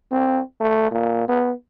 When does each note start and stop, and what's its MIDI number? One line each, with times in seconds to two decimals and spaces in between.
0.11 0.41 60
0.60 0.88 57
0.92 1.28 46
1.28 1.52 59